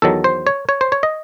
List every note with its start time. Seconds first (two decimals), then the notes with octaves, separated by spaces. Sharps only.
0.02 E2 D#3 F#3 A4
0.24 C5
0.47 C#5
0.69 C#5
0.81 C5
0.92 C#5
1.03 D#5